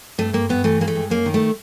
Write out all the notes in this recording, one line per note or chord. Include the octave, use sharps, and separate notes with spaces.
G2 A3
G2 A#3
G2 B3
E3 A3
G#3 A#3
A3
G2
F#2 A#3
D#3
A3